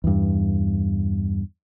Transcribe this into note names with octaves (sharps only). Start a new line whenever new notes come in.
E2 G2